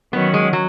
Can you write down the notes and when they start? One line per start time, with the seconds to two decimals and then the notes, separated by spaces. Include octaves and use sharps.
0.13 D#3 F#3 B3 C#4 F#4
0.34 G#3
0.53 F#3